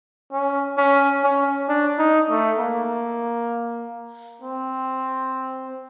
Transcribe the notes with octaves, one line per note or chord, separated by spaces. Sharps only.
C#4
C#4
C#4
D4
D#4
A3
A#3
C4